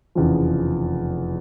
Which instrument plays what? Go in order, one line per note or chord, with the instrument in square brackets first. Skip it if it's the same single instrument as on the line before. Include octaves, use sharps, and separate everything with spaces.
[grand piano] F1 E2 C#3 F3